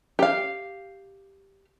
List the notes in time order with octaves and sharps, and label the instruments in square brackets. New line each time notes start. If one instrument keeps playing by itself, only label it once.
[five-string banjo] G4 F5